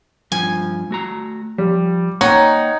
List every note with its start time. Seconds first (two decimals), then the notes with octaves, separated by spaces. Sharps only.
0.32 G2 F3 G#5
0.91 A3 F#4 A#5
1.58 F3 G3
2.21 A#3 D#4 C#5 D#5 F#5 G5